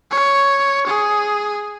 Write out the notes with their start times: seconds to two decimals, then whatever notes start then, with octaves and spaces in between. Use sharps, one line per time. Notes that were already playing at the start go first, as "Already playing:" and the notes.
0.11 C#5
0.87 G#4